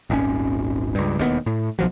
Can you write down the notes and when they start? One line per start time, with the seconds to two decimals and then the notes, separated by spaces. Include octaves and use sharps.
0.10 D#1 G#1 C#4
0.95 C#2 G2
1.18 E1 D#2 B2 B3
1.46 A2
1.79 B1 F3 F#3